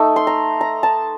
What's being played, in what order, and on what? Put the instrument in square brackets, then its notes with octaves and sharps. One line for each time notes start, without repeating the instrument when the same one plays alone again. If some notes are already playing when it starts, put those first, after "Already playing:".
Already playing: [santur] A3 D#4
C6
A#5
A#5
A5